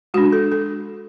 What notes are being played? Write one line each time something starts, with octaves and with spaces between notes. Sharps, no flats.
G#3 D4 F#4
A4
A4